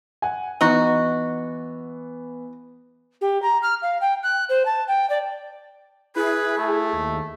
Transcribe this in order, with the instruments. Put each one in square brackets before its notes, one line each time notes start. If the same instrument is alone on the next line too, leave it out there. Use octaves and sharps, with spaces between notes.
[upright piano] F#5 G#5
[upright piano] E3 B3 [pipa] D#4 F#4
[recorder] G4
A#5
F6
F5
G5
F#6
C5
A5
G5
D5
[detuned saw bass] E4 [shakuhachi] G#4 [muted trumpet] B4
[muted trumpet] A3
[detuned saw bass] D#2